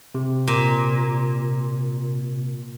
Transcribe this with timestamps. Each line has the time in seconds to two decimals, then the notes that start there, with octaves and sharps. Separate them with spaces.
0.15 C3
0.47 A#2